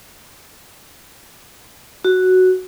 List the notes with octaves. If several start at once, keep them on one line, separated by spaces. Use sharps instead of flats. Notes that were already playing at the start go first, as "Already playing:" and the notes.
F#4